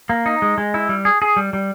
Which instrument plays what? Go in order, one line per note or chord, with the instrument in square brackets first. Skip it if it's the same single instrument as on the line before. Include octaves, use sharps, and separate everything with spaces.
[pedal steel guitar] A#3
D#4
G#3
G#3
E4
G3
G#4
G#4
G3
G3